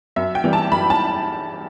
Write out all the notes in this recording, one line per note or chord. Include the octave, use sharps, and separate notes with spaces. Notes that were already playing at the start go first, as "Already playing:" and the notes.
F#2 E5
G5
E3 G3
A5
F#2 B5
A5